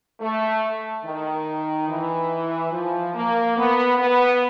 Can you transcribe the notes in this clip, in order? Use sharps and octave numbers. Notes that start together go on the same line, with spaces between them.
A3
D#3
E3
F3
A#3
B3
B3